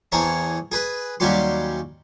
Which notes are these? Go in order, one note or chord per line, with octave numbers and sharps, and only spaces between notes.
E2 C4 G#4 C#5 A5 A#5
G#4 B4
D#2 F#3 G3 C#4 G4 C6